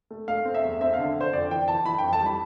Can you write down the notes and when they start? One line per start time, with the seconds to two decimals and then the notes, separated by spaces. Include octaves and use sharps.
0.10 A3
0.28 A3 F5
0.45 C4
0.54 E5
0.63 E2
0.81 C4 E5
0.94 D3 F5
1.16 D3 C5
1.33 F2 D5
1.51 E3 G5
1.68 E3 A5
1.86 E3 B5
1.98 G5
2.04 F2
2.13 A5
2.21 G3
2.26 B5